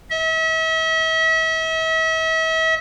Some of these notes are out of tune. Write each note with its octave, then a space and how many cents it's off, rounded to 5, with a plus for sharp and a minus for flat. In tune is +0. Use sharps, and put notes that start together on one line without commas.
E5 -40